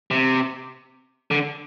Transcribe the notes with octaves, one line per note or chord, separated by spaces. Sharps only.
C3
D3